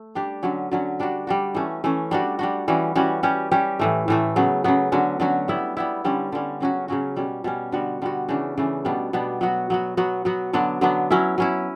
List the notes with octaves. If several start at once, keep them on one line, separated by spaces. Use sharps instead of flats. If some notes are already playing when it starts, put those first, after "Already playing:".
Already playing: A3
G3 D4 G4
D3 F#3 C#4
D3 F#3 C#4
G3 D4 F#4
G3 D4 F#4
E3 A3 C#4
E3 A3 C#4
G3 D4 F#4
G3 D4 F#4
E3 G3 C#4 F#4
E3 G3 C#4 F#4
G3 C#4 G4
G3 C#4 G4
A2 E3 A3
A2 E3 A3
C#3 F#3 B3
C#3 F#3 B3
D3 F#3 C#4 F#4
D3 F#3 C#4 F#4
G3 B3 E4
G3 B3 E4
D3 G3 C#4
D3 G3 C#4
C#3 F#3 C#4 F#4
C#3 F#3 C#4 F#4
B2 G3 C#4
B2 G3 C#4
D3 G3 B3 F#4
D3 G3 B3 F#4
C#3 E3 A3 D4
C#3 E3 A3 D4
B2 G3 B3 D4
B2 G3 B3 D4
F#3 B3 F#4
F#3 B3 F#4
F#3 B3 F#4
F#3 B3 F#4
D3 F#3 B3 D4
D3 F#3 B3 D4
F#3 C#4 E4
F#3 C#4 E4